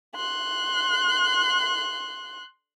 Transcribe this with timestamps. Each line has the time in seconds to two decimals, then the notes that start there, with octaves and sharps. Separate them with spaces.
0.16 C6 F#6